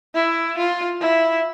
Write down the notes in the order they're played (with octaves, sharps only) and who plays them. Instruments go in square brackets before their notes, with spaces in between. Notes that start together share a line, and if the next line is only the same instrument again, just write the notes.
[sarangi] E4
F4
E4